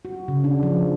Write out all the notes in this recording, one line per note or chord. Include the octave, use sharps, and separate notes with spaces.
F#4
C#3
D4
F3